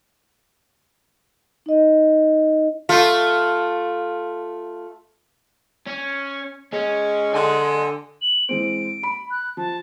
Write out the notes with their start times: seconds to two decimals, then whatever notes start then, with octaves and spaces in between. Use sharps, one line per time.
1.66 D#4 D#5
2.89 A3 F4
5.87 C#4
6.73 G#3 C#4
7.35 D3 G#5 C6
8.21 F#7
8.49 E3 G#3 C4 D7
9.03 B5
9.31 F#6
9.57 F3 A5